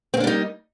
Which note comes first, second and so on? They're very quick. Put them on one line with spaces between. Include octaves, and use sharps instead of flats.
C4 A#3 D4 G3 D#4